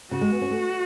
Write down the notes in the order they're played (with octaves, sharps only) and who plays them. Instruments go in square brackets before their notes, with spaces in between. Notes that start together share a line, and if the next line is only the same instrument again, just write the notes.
[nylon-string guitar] C#3 [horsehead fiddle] F#4
[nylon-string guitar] G#3
B3
C#4
A3